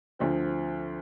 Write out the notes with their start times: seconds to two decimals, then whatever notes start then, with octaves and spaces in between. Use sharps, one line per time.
0.19 D2 D3 F3 C4